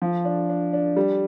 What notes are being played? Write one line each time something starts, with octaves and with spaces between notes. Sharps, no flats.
F3
D4
D4
D4
G3